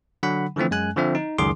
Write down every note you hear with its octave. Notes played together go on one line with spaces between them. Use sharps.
D3 F#3 F#5 B5
D3 E3 F3 A3 C4
F#2 G#3 G#5 F#6
D3 F3 C4 E5
D#4
C#2 F#2 D#3 G#4 C6 D6